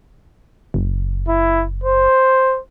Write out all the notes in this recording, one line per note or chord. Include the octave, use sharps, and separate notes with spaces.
F#1
E4
C5